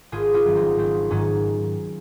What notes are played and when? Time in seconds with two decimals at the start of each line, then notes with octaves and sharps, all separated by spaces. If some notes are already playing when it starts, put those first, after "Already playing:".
0.12 G#1 F4 G#4
0.34 C#4 F4
0.45 G#2 D#3 F#3
0.56 C4 D#4
0.78 G#1 C4
1.11 G#2 D#3 F#3 C#4